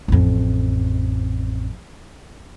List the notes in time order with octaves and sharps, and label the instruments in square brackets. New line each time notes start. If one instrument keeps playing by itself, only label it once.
[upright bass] A1 F2